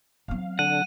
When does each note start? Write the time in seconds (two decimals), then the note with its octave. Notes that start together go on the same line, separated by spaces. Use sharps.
0.28 F#3 C4 F5
0.59 D3 D4 A4 F#5 D#7